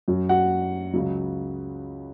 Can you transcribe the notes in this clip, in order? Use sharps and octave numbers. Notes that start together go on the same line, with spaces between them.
F#2 F#3
F#4 F#5
C#2 C#3 F#3